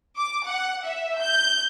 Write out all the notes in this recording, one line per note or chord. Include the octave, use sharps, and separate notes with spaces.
D6
F#5
E5
G6